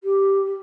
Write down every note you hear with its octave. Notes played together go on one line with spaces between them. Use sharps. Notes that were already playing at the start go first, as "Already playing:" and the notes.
G4